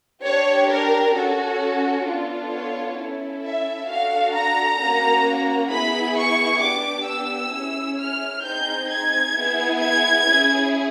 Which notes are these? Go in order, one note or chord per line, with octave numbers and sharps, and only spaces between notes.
D4 G4 C#5
A#4
C#4 F#4 A4
B3 D4 F4 A4
C#5
C#4 E4 A4
E5
D4 F#4 A4 F5
A#5
A#3 C#4 F#4
B3 E4 G#4 B5
C#6
B3 D4 G4 D6
E6
C#4 E4 G#4
F6
C4 D#4 G#4 G6
G#6
B3 E4 G#4
G#6
C#4 E4 G#4